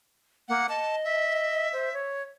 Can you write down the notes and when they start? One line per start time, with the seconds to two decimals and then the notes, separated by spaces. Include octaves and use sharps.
0.49 A#3 F#5
0.69 D#5 A5
1.05 E5
1.73 C5
1.93 C#5